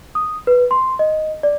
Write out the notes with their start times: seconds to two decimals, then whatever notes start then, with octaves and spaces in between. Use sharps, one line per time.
0.15 D#6
0.47 B4
0.71 C6
0.99 D#5
1.43 D5